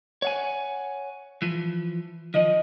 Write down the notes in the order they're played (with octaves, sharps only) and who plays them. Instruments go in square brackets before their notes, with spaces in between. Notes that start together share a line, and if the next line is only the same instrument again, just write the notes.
[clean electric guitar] C#5 F#5 G#5
E3 F3
[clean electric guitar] D#3 F3 [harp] D#5